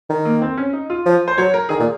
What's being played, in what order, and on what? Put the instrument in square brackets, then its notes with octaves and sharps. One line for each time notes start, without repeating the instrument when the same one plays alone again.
[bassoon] D#3
[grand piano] A#3
C4
C#4
D#4
F4
[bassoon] F3
[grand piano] C5
[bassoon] F#3 [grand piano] C#5
[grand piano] A#4
[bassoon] D#3 [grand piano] G#4
[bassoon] A#2